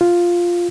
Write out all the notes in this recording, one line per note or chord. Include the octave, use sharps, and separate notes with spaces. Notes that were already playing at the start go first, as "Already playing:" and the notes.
F4